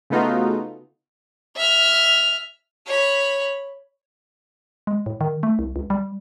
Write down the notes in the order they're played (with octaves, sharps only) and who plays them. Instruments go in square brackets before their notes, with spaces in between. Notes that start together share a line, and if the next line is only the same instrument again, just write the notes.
[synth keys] C#3 A3 B3 D#4 F4 F#4
[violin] E5 F6
[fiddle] C#5 B5
[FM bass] G#3
A2
D#3
A3
C2
C#2
G3